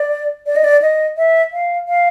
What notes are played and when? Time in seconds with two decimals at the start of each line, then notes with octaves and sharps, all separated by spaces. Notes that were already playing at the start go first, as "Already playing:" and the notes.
Already playing: D5
0.46 D5
0.56 D#5
0.64 D5
0.82 D#5
1.17 E5
1.53 F5
1.88 F5